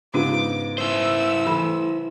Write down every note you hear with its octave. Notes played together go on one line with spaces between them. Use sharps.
G#2 C#3 B3 D4 F4 G4 D6
E4 C5 E6
E3 A3 B5